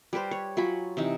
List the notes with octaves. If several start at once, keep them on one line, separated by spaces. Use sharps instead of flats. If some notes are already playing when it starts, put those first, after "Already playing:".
G3 G4 B4 C5
C#5
F#3 F4 G#5 B5
C3 E3 D#4